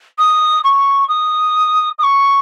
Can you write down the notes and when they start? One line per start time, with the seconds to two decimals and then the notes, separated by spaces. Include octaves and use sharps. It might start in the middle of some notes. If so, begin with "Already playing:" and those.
0.19 D#6
0.64 C#6
1.08 D#6
1.98 D#6
2.03 C#6